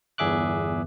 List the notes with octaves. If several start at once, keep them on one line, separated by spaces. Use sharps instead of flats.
G1 E2 G#4 E5 D6 F#6